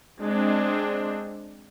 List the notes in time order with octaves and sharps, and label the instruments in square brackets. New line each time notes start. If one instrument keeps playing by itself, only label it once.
[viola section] G#3 C4 D4